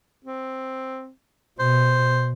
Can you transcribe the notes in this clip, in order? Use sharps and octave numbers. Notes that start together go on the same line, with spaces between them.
C4
B2 C5